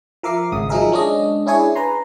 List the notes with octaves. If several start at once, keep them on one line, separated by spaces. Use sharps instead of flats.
F3 A#4 E5 D6 C7
G#1 C#3 D#6
F3 F#3 D#4 G#4 A#4 E5
G#3 C#4 D4 D#5
C#4 D4 E4 G#4 C#5 G#5
B4 G#5 A#5 C6